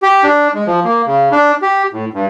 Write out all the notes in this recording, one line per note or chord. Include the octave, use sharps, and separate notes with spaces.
G4
D4
G#3
F3
A#3
C#3
D4
G4
A2
G2